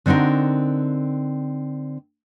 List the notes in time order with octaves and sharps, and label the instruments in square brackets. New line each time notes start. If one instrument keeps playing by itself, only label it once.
[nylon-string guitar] D3 C4 D#4 F#4 A#4